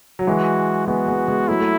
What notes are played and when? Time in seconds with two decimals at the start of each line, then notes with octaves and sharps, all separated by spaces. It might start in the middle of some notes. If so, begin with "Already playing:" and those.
0.19 F#3
0.27 E3 G#3 F#4
0.88 G#3 B3 F#4
1.08 G#3 B3
1.28 G#3 B3
1.48 F#3 A3 E4
1.60 A3